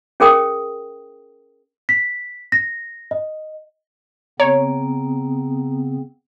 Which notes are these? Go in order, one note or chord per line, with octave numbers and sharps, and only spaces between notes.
C#4 G#4 A#4 G5 D#6
B6
A#6
D#5
C#3 B3 C4 C#5 A#5 D7